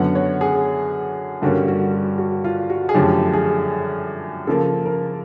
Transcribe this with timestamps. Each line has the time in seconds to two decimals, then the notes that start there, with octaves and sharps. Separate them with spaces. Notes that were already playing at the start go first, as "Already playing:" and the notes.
Already playing: F#2 D3 F#3 B3 F#5
0.15 C#5
0.41 G#4
1.42 G2 D3 G3 A#3 C#4 F#4
1.68 F#4
1.93 F#4
2.18 F#4
2.44 F4
2.70 F#4
2.89 G#4
2.94 F#2 D3 F3 A3 C#4 G4
3.33 G#4
4.47 C#3 F3 A#3 A4
4.86 A#4